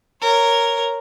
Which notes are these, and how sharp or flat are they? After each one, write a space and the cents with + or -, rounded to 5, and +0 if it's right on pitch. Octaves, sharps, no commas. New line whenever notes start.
A#4 -5 C#5 +0